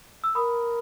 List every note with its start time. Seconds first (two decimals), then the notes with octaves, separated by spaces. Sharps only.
0.24 E6
0.35 A#4 B5 D#6